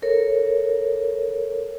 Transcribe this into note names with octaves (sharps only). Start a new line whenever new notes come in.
A4 A#4 C#5